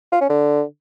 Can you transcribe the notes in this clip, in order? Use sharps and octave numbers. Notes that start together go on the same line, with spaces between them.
F4
C#4
D3